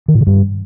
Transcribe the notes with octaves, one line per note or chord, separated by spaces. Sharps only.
D#3
A2
D3
G2